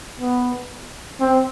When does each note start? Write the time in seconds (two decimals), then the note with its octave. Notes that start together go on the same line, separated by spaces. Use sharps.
0.20 B3
1.20 C4